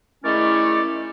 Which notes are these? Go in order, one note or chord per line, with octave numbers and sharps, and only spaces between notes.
D#3 G#3 A3 C#4 E4 D5